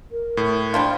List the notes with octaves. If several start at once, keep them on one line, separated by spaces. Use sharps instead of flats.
A#4
A2
G3 D4 F4 C5